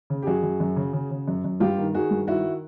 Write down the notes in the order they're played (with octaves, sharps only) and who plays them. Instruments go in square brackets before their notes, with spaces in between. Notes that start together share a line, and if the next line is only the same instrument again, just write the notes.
[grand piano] C#3
G4
F#2 F#4 G#4
F#2
F#2
C#3
C#3
C#3
F#2
F#2
G2 F4 G4
D#3
D#3 F#4 G#4
G2
D#3 E4 F#4